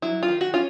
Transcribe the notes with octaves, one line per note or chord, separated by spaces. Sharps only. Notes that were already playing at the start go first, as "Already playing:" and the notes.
F#3 E4
F4
D#3
F#4
C#4 F4